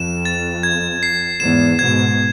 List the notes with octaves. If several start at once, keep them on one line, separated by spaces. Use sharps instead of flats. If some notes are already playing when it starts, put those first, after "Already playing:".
Already playing: F2 E7
A6
G#6
C7
E2 G#2 E7
G#2 B2 G#6